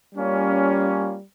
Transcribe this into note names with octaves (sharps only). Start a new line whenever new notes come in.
G3 A#3 C#4 F4